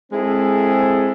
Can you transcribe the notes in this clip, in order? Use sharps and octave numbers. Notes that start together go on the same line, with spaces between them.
G#3 C4 E4 G#4 A4